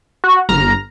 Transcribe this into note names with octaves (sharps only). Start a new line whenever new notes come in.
F#4
G1 A#5 F6